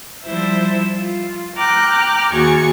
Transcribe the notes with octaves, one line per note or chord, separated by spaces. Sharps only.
F3 G3 E4 C5 E5
F4
G5 A#5 D6 F6 F#6
D#2 F#4 G#4 C#6 G#6